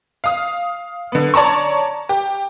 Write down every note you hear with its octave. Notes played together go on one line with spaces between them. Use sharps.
F5 D#6
D3 B3
C#5 D5 A5 A#5 C#6
G4